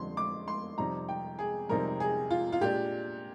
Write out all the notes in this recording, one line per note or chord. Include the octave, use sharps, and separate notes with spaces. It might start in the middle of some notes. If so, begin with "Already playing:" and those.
Already playing: F2 D3 G3 C4 C6
D6
C6
F2 C3 G3 C4 D#4 A#5
G5
G#4
F2 C3 G3 C4 D#4 A#4
G#4
F4
F4
A#2 G#3 D4 G4